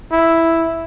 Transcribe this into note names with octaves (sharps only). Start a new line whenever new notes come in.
E4